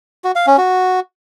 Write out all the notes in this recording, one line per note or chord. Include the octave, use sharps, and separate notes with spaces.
F#4
F5
C#4
F#4